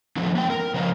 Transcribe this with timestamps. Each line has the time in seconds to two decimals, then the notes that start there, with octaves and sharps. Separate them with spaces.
0.16 D3 E3 F3 A3 B3
0.35 A#3 B3 G5
0.50 A#4
0.74 C#3 F3 C5 D#5 F5 A#5